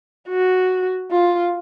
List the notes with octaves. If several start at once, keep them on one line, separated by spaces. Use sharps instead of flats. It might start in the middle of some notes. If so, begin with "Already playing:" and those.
F#4
F4